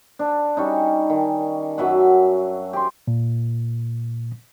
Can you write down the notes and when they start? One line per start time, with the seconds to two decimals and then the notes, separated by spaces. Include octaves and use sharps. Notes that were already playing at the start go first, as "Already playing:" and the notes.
0.19 D4
0.57 G3 C#4 D#4
1.10 D#3
1.78 F#2 F#3 E5 F#5
2.73 G4 C6
3.08 A#2